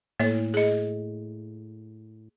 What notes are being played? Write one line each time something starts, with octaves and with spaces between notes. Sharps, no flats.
A2 A#3 C#5
G#4 D#5